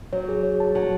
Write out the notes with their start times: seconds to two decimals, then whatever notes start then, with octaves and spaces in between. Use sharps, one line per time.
0.13 F#3 C#5
0.28 G#4
0.43 C#5
0.60 A5
0.75 F#3 A5